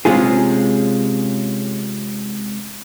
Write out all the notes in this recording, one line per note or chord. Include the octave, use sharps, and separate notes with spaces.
C3 G#3 C#4 F4 G#4